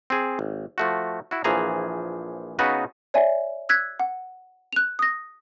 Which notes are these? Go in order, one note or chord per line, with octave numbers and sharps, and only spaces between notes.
C4 G#4
G#1
F3 A3 F#4
E4 F#4
A#1 E3 F3 G#4 A#5
C#3 B3 D#4 F#4 B4
C#5 D5 E5 G#5
E6 F#6 G#6 B6
F#5
F#6 F7
D#6 A#6